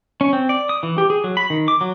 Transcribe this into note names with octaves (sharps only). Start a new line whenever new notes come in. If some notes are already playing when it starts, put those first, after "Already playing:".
C#4
C4
D5
D#6
E3
G4
G#4
F#3
B5
D#3
D6
F#3